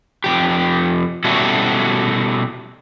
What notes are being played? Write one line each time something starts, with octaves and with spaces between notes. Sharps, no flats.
F2 E3 G4
B2 G3 C#4 E4 F#4 A4